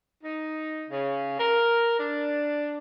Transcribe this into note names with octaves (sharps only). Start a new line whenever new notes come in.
D#4
C#3
A#4
D4